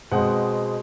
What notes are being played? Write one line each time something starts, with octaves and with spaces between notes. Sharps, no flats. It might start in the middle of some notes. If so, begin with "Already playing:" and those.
B2 G#3 C4 F#5